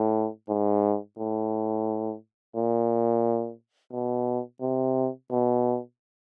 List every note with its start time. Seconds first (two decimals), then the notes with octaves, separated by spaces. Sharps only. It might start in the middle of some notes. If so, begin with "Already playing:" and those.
Already playing: A2
0.49 G#2
1.18 A2
2.56 A#2
3.92 B2
4.61 C3
5.30 B2